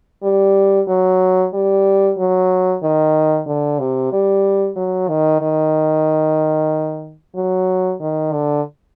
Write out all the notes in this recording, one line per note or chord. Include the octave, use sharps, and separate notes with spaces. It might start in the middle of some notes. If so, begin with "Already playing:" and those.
G3
F#3
G3
F#3
D#3
D3
C3
G3
F#3
D#3
D#3
F#3
D#3
D3